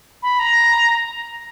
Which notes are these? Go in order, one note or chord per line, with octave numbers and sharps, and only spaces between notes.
B5
A#5